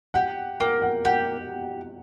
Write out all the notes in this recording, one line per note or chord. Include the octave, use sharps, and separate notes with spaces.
G4 F#5
A#3 G5
F#5
G4 F#5